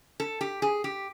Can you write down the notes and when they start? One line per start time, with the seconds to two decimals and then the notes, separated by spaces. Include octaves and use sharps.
0.20 A4
0.41 G4
0.62 G#4
0.84 G4